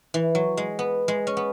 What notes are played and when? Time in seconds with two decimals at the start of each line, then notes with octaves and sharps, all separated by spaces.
0.14 E3
0.35 F#3
0.57 G#3
0.79 B3
1.08 G#3
1.27 C#4
1.37 B3